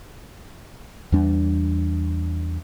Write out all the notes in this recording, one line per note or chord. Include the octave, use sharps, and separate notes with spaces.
E2 G3 D4